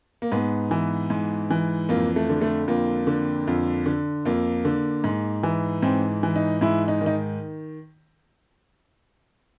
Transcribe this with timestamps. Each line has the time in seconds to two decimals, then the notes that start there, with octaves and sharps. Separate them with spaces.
0.22 A#3
0.32 G#2 B3
0.71 E3
1.10 G#2
1.50 E3
1.89 F2 A#3
2.16 A3
2.29 D3
2.42 A3
2.68 F2 A#3
3.07 D3
3.47 F2
3.86 D3
4.25 F2 A#3
4.65 D3
5.04 G#2
5.43 E3
5.82 G#2 C4
6.23 E3
6.36 D#4
6.61 G#2 E4
6.88 D#4
7.01 D#3
7.06 D#4